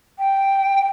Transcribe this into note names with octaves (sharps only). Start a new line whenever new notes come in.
G5